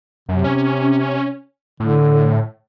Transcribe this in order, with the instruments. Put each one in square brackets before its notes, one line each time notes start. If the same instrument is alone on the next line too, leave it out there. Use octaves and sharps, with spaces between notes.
[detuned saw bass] F#2 [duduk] C3
[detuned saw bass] C#4
[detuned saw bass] A2 [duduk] D3